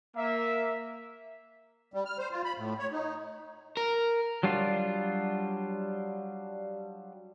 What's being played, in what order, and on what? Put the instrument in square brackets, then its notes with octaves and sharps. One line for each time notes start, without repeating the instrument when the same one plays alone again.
[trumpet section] A#3 E5
[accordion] G3
F6
C5
F4
B5
A2
C#5
D#4
[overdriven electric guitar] A#4
[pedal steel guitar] F#3 G3 D4 F4